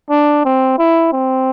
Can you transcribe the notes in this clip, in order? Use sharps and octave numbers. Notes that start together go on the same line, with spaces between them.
D4
C4
E4
C4